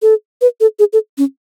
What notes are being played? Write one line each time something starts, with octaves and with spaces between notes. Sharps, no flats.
A4
B4
A4
G#4
A4
C#4